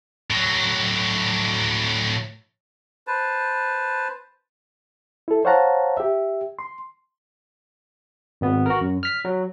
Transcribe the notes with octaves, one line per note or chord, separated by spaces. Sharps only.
A2 F#3
B4 C5 A5
E4 A4
C5 C#5 F5 F#5 A5 A#5
G4 E5
C6
G#1 B3
F#4 A#4
F#2
F6 B6
F#3